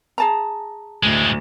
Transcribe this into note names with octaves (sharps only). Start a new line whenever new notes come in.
G#4 A5 A#5
D2 A2 G#3